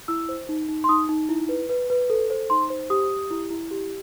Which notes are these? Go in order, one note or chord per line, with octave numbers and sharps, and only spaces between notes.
E4 E6
C5
D#4
D#4
C6
D#4 D#6
D#4
E4
B4
B4
B4
A4
C5
D#4 C6
C5
G4 D#6
G4
E4
E4
G4